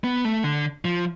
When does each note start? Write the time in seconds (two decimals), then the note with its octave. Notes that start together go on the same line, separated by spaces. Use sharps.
0.04 B3
0.25 A3
0.44 D3
0.85 F3